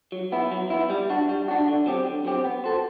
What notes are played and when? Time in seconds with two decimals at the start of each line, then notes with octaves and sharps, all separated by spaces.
0.12 F#3
0.32 B3 E4
0.51 F#3
0.70 B3 E4
0.90 G3
1.10 D4 F#4
1.29 G3
1.48 D4 F#4
1.68 D3
1.86 F#3 C4 G4
2.06 D3
2.25 F#3 C4 G4
2.45 B3
2.64 F#4 A4 C5